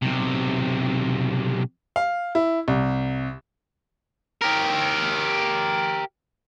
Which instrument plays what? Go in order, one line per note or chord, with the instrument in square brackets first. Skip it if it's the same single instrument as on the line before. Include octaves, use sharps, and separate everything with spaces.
[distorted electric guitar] B1 C3
[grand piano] F5
E4
C2
[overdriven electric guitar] G4 A#4